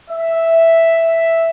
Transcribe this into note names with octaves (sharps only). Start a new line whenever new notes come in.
E5